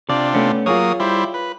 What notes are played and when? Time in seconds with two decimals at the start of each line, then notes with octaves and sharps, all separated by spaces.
0.09 C3 D4 F4 D5
0.34 A3 B3 C#4
0.66 F#3 A#3 F4 G#4 C#5 D#6
1.00 G3 E4 C5
1.34 B4